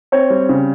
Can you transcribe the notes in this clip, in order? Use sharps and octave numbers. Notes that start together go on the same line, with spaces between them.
C4 C#5
G3
C#3